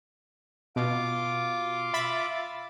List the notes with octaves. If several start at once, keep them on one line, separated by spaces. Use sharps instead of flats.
B2 F4 D6
E5 B5 A6